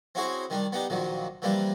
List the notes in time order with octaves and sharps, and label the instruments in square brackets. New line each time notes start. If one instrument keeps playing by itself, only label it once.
[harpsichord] C4 C#4 E4 F#4 G#4 C5
D#3 G3 D4
B3 D4 D#4 G4
A#1 D#3 F3 F#3
E3 F3 G3 A#3 D4